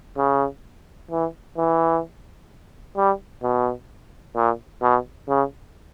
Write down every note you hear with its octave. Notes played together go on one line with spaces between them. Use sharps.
C#3
E3
E3
G3
B2
A#2
B2
C#3